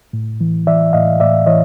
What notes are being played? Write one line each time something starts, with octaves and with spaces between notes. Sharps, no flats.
A2
E3
E3 D5 E5
A2 D#5 F5
A2 D5 E5
E3 C#5 D#5